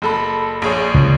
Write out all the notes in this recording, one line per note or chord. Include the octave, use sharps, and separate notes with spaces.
F#1 A4 B5
A#1 G#4 C#5
C#2